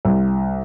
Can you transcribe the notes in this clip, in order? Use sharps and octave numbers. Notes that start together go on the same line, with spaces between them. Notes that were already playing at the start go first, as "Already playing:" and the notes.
C2